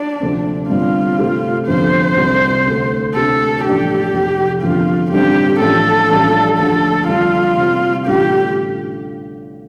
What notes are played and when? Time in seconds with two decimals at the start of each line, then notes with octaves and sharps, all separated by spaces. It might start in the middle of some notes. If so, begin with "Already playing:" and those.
Already playing: D4
0.20 D2 C3 F3 A3 C4
0.69 G1 G2 G3 C4 F4
1.18 C3 A3 C4 G4
1.67 G1 F2 F3 C5
2.17 C2 C3 G3
2.66 D2 D3 A3
3.15 D2 C3 A3 C4 G4 A4
3.64 A1 G2 F3 A3 D4 G4
4.13 F1 F2 C3
4.62 G1 F2 F3 F4
5.11 A1 G2 D3 G3 C4 G4
5.61 A1 G2 F3 A3 F4 A4
6.10 A1 G2 F3 D4 G4
6.59 D2 D3 F3 A3 A4
7.08 F2 D3 G3 F4
7.57 C3 G3 C4 G4
8.06 A1 G2 D3 A3 F4 G4